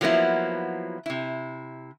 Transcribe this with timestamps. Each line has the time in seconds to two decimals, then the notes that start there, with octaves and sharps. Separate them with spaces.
0.01 F3 F#3 A#3 B3 E4
1.06 C3 E4